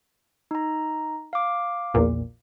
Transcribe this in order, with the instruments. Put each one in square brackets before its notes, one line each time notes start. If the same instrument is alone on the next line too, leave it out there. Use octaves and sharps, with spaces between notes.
[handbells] D#4 A#5
F5 D6
[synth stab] A#1 E2 A#2